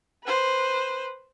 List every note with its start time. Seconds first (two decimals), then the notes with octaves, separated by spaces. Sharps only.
0.24 B4 C5